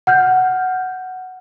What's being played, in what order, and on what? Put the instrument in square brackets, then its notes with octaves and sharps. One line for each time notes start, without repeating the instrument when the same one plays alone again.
[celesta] F#5 F6 G6